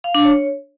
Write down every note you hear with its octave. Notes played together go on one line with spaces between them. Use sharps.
F5
D4
C#5